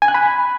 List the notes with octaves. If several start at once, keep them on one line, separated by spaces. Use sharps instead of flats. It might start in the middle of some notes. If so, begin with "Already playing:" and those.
G#5
F#6
B5